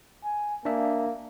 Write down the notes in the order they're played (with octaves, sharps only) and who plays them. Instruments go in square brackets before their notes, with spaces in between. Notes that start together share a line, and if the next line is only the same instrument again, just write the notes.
[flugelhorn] G#5
[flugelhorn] A#3 [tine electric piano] D4 E5